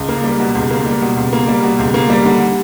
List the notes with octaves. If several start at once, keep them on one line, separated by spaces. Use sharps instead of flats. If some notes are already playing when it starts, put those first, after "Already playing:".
Already playing: C#2
A#3
G3
B2
C#2
A#3
G3
B2
C#2
A#3
G3
B2
C#2
A#3
G3
D3